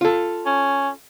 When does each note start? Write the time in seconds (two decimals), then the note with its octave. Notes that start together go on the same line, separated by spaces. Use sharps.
0.01 F4 A4
0.46 C#4